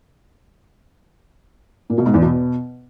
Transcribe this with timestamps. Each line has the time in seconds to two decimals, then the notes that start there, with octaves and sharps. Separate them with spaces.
1.90 A#2
1.98 B2
2.06 G#2
2.14 E2
2.22 B2